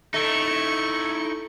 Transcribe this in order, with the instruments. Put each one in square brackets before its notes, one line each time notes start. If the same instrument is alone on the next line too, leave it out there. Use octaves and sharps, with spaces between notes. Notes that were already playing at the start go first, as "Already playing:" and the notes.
[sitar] A3 [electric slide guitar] D#4 E4 [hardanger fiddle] C#6